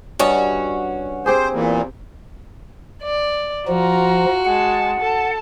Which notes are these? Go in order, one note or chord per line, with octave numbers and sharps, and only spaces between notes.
G2 G3 C#4 F#4 D#5
C4 G4 G#4 C5
E2 A#2
D5
F3 F4 F#4 A#5
G#3 F#5 A5
A4 A5